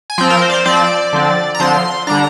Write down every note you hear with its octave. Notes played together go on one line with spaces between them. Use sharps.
G#5
F3 C4 G5
A#4
C5
D5
C5
F3 C4 D5
D3 F3 C4
A#5
D3 F3 C4 C6
D3 G3 D4 A#5